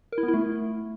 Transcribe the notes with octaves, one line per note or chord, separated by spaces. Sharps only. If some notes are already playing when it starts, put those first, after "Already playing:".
A#4
E4
B3
E4
A3